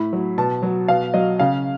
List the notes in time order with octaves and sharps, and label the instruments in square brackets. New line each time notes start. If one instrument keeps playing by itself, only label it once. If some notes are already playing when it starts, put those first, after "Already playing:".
Already playing: [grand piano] A2 B5
F#3
B2 A5
F#3
B2 F5
F#3 D#5
C#3 F5